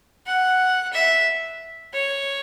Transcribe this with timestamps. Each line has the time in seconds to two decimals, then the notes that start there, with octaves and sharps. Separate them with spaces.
0.26 F#5
0.93 E5
1.93 C#5